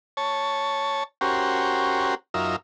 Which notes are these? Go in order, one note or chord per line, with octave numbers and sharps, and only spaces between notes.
C#5 A5
C#4 F#4 G4 A#4 C5
F#2 D#4 F4 A#4 E5